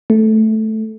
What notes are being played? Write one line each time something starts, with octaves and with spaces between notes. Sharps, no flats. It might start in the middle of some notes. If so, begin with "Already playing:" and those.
A3